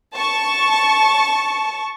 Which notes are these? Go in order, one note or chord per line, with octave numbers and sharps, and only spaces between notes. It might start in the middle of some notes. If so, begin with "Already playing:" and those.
A5 C#6